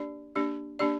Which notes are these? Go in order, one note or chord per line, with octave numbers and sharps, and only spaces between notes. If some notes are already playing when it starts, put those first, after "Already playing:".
Already playing: A#3 D4 G4 D5
A#3 D4 G4 D5
A#3 D4 G4 D5